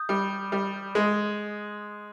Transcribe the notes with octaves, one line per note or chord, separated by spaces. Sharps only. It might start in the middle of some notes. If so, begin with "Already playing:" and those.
Already playing: D#6 G6
G3
G3
G#3